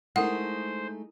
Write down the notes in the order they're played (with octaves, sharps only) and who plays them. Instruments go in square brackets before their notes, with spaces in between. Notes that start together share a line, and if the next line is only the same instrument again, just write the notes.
[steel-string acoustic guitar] G#3 A3 D#4 [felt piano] E4 A#4 D#6 [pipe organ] C5 [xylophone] F#5